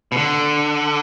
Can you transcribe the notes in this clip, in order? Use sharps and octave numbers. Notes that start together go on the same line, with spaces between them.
B2
D3